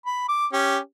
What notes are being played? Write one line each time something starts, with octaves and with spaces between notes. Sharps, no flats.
B5
D6
C#4 G4